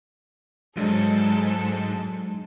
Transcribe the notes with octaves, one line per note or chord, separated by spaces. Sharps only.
C#2 G#2 F#3 G#3 D4 G#4 A4